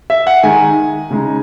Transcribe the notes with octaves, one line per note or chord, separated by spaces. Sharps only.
E5
F#5
D#3 G#3 D#4 G#5
C#3 G#3 D#4